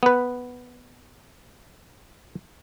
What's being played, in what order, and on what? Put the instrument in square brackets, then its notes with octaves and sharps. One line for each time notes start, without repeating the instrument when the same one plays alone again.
[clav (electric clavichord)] B3 B4